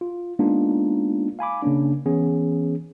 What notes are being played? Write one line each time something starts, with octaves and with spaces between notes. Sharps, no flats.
F4
G#3 A#3 B3 D4 D#4 F4
F5 G#5 B5 D6
C#3 A#3 C#4 D4
E3 B3 C#4 G#4